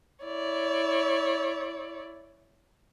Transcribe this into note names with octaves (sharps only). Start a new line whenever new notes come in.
E4 C#5 D5